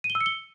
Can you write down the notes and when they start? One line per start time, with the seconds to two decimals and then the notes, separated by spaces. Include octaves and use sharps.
0.04 D#7
0.10 G7
0.15 E6
0.21 C#7
0.26 G7